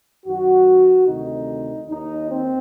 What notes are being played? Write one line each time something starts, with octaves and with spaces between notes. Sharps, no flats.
F#2 D#3 F#4
D2 C3 D#3 D#4
D#2 D#3 D#4
C4